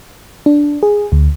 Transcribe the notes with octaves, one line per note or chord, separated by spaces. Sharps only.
D4
G#4
D2